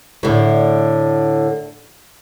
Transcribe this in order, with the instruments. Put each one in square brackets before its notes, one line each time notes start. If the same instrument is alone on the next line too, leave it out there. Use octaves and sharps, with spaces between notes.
[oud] A2 D3